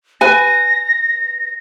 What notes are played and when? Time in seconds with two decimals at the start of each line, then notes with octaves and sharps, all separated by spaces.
0.21 B4 G#5 A#6